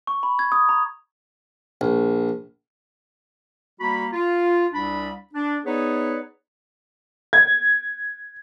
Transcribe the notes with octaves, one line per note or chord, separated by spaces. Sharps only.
C#6
B5
G#6
D#6
A#5
A#1
G3 A#3 F#4 B5
F4
C2 D4 B5
D4
B3 D#4 G#4 B4 C#5 D5
G#6